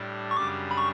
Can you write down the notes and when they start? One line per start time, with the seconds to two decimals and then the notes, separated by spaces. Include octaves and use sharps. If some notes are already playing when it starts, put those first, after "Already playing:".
Already playing: A2 G3 D4
0.31 C#6
0.36 F#2 C#3 G3 D4 D6
0.71 B5
0.77 C#6